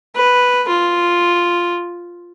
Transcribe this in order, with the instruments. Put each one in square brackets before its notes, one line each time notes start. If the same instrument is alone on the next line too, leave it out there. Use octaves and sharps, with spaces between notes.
[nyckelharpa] B4
F4